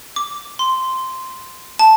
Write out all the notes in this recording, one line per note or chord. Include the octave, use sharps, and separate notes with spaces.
D6
C6
A5